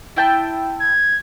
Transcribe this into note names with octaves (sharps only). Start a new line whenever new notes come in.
E4 G5 A5
G#6